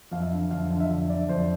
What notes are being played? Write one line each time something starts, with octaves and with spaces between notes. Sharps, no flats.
F2 F5
E5
D3
F2 F5
D3
E5
F2
D3 D5
F2 C5